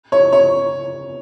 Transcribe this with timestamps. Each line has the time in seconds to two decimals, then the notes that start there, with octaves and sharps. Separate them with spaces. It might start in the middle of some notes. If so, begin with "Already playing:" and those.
0.12 C#5
0.32 C#5